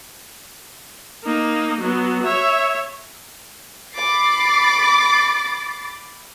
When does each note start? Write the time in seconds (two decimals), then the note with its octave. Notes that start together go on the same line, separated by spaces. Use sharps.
1.24 A#3 D#4
1.81 F#3 B3
2.23 C#5 E5
3.95 B5 D6 A6 C7